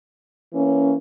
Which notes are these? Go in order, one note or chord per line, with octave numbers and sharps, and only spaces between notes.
E3 A#3 C#4